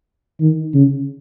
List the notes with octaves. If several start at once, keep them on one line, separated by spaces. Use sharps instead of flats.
D#3
C#3